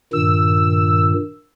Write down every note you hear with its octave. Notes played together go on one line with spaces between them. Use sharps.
G2 A#2 D#3 E6